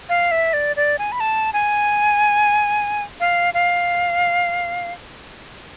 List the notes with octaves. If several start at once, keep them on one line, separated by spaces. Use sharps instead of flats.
F5
E5
D5
D5
G#5
B5
A5
G#5
F5
F5